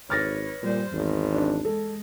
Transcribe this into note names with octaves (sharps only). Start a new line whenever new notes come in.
G#1 B4 C#5 F6 A6 A#6
A#2 G3 C5
G#1 E2
D4
G#3 A4